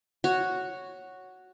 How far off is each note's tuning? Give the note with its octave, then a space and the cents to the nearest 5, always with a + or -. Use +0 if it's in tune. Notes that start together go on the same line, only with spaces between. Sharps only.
F#4 +0 C#5 +0